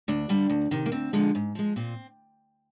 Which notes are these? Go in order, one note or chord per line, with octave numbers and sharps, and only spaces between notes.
D2 D4
D3 G3
D2
C3 D#3
A#3
D2 C4
D3 F3 G#3
G#2
F3 G#3
A#2 C4